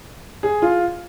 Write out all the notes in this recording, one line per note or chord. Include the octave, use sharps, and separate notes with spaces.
G#4
F4